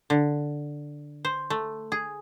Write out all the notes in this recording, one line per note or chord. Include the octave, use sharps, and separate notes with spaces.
D3
C5
A3
G#4